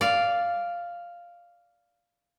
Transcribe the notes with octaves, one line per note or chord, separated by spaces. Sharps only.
D5 F5